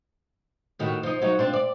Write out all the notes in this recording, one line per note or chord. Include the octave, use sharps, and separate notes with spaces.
A2 D#3 F#4
F3 D#4
F#3 D#4 F#4
C4 D4 F4
D5